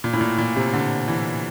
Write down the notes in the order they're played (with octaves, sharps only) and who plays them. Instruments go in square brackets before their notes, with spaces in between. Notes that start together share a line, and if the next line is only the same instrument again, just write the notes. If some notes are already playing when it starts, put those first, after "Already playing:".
[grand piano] A#2
A2
A#2
A#2
C3
D3
E3